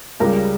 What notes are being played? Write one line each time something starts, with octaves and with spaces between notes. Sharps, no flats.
C#2 C#3 G3 G4 A#4